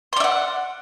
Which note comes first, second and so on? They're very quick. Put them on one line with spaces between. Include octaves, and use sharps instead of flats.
C6 D5 E5 F#5